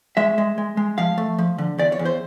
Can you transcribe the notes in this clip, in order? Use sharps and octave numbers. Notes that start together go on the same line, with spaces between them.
G#3 E5
G#3
G#3
G#3
F3 F5
A3
F3
D3
E2 D5
C#5
E2
C5